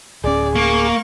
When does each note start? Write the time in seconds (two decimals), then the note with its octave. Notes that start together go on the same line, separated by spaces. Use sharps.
0.24 D1 C#4 G#4 D5
0.56 A#3 C#6